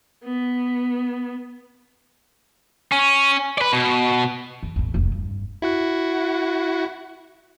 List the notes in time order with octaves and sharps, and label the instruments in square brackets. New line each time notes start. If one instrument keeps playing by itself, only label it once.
[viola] B3
[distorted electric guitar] C#4
B4 D5
B2
[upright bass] E2
A1 E2
F1 C#2
G2
[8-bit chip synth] E4 F#4 F#5